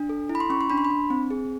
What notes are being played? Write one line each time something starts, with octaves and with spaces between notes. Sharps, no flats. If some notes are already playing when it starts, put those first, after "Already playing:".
Already playing: D4
A4
E4
B5
C6
C#4 C#6
C6
D4 B5
C6
B5
D4
C4
G#4